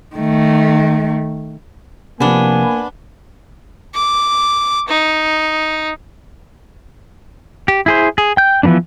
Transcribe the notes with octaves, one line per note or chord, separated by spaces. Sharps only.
D#3 A3
C3 F3 A#3 B3 D4 G#5
D6
D#4
G4
E4 G#4 C5
G#4
G5 G6
E3 F3 A3 B3 D4